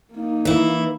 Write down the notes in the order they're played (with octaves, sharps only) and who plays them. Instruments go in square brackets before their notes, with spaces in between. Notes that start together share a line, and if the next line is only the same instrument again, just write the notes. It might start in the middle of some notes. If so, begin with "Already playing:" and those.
[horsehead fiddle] A#3 D#4
[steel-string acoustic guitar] E3 E4